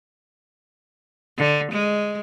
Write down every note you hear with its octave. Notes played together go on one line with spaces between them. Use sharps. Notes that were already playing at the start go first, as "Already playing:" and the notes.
D3
G#3